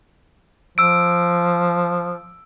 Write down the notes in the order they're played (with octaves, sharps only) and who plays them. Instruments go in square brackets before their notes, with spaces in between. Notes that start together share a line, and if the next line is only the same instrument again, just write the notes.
[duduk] F3 [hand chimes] E6 D7